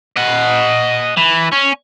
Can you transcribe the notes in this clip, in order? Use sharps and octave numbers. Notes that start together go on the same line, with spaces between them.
D#5 F#5
E3
C#4